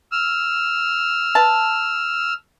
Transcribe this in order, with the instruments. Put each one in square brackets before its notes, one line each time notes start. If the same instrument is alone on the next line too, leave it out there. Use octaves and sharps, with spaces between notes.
[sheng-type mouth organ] E6 F6
[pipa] B4 A5